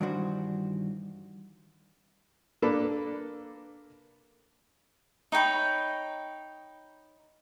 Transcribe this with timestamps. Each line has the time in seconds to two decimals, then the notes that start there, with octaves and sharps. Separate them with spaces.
0.01 G2 D#3 E3 D4 F#4 C5
2.62 A#3 D4 A4 B4
5.32 D#4 C#5 G5 B5